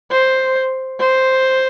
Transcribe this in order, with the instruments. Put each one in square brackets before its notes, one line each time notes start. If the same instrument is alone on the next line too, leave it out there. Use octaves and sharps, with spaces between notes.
[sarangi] C5
C5